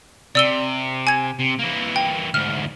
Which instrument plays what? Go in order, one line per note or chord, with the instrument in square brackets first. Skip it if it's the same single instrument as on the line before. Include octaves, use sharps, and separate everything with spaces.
[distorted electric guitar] C3 [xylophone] D5 E6 G7
[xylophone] G#5 G#6
[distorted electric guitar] C3
E3 A#3
[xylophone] G5
[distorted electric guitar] D2 G#2 [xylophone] F6